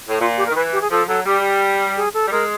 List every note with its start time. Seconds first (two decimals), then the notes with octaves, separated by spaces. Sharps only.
0.09 A2
0.20 A#2 F4
0.37 G4
0.46 A#4
0.49 D#3
0.55 E3 B4
0.72 G4
0.81 G#4
0.90 F3 A4
1.08 F#3 A4
1.25 G3 G4
1.96 G#4
2.14 A4
2.27 G3
2.31 G#3 A#4